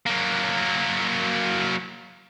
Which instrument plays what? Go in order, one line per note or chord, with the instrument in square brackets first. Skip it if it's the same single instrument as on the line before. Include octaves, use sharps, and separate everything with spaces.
[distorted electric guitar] F#3 A#3